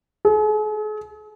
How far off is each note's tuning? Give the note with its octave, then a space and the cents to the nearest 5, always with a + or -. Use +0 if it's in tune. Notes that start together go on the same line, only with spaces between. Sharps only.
G#4 +45